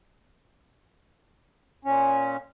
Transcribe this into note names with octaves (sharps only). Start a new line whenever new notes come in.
A#2 C#4